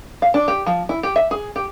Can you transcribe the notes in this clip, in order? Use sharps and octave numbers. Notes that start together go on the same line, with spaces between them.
F5
D4
G4
F3
E4
G4
E5
G#4
G4